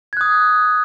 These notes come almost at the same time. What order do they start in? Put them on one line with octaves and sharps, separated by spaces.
G#6 F#6 D#6